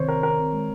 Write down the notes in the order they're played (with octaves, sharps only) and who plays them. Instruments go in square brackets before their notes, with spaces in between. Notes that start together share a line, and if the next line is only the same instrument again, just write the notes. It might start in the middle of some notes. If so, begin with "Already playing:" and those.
Already playing: [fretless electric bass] C3 D#3 [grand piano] C5 C#5
[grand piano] A#4
[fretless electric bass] C4 [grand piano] A#4
[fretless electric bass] G#3